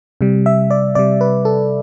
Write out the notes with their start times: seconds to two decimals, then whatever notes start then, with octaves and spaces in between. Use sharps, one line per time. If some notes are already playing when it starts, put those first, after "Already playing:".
0.21 C3 G3
0.46 E5
0.71 D5
0.95 C3 G3 D5
1.21 B4
1.45 A4